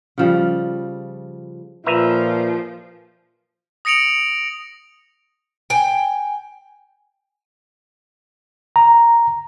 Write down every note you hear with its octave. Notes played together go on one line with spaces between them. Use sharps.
C#3 F3 G3
A#2 F3 B4 E5 A#5
D#6 A#6 C#7 D7 F7 F#7
G5 G#5
A#5